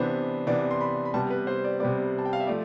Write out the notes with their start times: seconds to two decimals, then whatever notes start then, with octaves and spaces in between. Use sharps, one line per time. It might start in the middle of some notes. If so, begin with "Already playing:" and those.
Already playing: C3 E3 B3 D4 C5
0.47 C3 E3 B3 D4 D5
0.71 C6
0.81 B5
1.05 B5
1.14 C3 G3 B3 A5
1.31 B4
1.47 C5
1.64 D5
1.80 C3 G3 B3 D5
2.19 A5
2.25 G5
2.33 F5
2.40 E5
2.47 F3 A3 D5